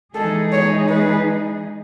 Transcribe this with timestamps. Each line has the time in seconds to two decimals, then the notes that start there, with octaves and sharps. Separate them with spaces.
0.14 E3 G#3 D#4 G#4 A4
0.52 C#5
0.89 B4